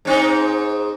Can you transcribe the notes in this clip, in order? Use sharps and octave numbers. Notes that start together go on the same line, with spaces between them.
G#2 C4 D#4